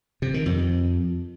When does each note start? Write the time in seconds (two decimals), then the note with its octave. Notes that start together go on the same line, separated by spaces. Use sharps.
0.22 C3
0.34 D#3
0.46 F2